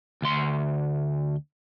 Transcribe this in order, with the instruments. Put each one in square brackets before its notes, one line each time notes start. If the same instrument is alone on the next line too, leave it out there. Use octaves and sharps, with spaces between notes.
[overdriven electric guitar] D2 C6